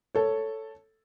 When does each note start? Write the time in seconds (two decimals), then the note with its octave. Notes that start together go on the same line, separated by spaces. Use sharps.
0.15 A4 C#5